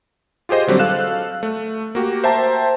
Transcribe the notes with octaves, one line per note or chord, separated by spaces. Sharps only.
F4 G4 G#4 C5 D#5
D3 F#3 G3 C4
A4 F5 F#6 E7
A3
A#3 F#4 G4
C5 E5 G5 A5 A#5